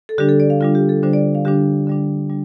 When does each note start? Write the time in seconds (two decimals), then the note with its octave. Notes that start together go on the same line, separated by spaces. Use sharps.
0.09 A4
0.18 D3 G3 D4 G4
0.29 A4
0.40 D5
0.50 F5
0.61 D3 G3 D4 F4
0.75 G4
0.89 A4
1.03 D3 G3 D4 C5
1.13 D5
1.35 F5
1.45 D3 G3 D4 G4
1.87 D3 G3 D4
2.30 G3 D4